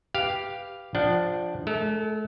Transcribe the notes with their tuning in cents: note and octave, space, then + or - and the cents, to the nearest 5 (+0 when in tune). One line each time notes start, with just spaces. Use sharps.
G4 +0 B4 +0 F5 +0
F3 +0 D4 +0 F#5 +35
A3 -40 A4 +35